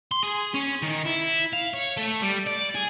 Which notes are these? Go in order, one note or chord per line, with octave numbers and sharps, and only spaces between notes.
C6
G#4
C#4
D#3
E4
F5
C#5
A3
G3
D5
G#4